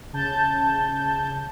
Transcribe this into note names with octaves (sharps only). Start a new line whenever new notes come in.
C#3 A5 G6